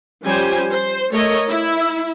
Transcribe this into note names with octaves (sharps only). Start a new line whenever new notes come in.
F3 G3 C#4 G4 C5 G#5
C5
A3 A#4 C#5 D#5
E4 E5